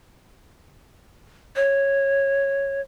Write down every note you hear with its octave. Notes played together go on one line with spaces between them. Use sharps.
C#5